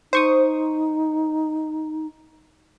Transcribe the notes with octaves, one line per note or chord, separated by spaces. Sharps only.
D#4 C5 C#6 D#6